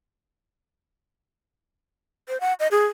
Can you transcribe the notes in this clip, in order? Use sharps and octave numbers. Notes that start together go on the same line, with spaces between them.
C5
F#5
D#5
G#4